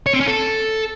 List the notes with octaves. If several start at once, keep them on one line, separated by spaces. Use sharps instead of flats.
C#5
C4
C#4
A4